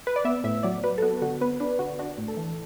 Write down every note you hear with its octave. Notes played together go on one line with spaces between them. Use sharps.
B4
D5
B3 E5
A2 E5
F#3 D5
F#3 B4
A4
B3 F#4
D3 F#4
B3 B4
D4 B4
D3 F#4
D4 F#4
A2
A4
E3